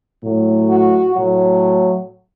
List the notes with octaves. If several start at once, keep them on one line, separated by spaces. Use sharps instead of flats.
A2 F#3
F#4
A2 F#3